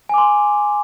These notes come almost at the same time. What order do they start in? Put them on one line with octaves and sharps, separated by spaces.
G#5 D6 C6